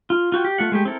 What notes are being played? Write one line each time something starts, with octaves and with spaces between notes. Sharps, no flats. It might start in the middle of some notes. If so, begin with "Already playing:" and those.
F4
F4 F#4 G5
G4
A3 F4 F#5
G#3 A3 G4
C4 E4 A4 A#4